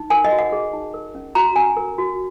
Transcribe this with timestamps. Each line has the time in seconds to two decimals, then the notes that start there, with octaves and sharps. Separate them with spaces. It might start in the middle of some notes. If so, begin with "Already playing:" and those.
Already playing: D#4
0.10 A#4 G#5
0.25 D#5
0.32 F#4
0.39 F#5
0.52 G#4
0.73 D#4
0.94 A#4
1.15 C#4
1.35 F#4 A#5
1.56 C#4 G#5
1.77 A#4
1.98 F#4